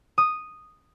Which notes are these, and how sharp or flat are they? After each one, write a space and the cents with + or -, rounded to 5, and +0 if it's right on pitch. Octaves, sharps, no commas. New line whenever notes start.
D#6 -5